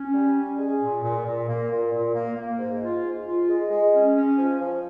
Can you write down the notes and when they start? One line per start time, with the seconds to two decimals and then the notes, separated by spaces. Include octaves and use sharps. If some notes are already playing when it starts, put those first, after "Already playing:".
Already playing: C#4
0.14 G3
0.36 C#4
0.59 G#4
0.81 A#2
1.03 A#2
1.25 A#2
1.48 A#3
1.70 A#2
1.92 A#2
2.14 A#3
2.36 A#3
2.59 G#2
2.81 F4
3.04 G#2
3.25 F4
3.48 G#3
3.71 G#3
3.93 C#4
4.15 C#4
4.37 F3
4.60 F3